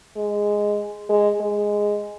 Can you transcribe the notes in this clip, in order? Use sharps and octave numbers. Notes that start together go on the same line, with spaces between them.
G#3
G#3
G#3